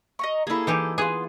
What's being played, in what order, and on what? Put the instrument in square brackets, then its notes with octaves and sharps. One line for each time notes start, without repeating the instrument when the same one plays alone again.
[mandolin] D#5 A#5 C#6
[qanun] A#3 E4 [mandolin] G#4 A4
[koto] E3 D#4 G4
[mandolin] B3 F4 [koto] G#4